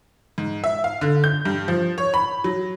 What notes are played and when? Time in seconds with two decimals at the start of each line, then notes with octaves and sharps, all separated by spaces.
0.38 G#2
0.64 E5
0.84 F5
1.01 D3
1.24 G6
1.45 G2
1.68 F3
1.98 C#5
2.14 B5
2.44 F#3